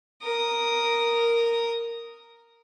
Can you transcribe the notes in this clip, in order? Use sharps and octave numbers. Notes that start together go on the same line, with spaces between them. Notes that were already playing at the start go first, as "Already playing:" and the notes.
A#4 D#6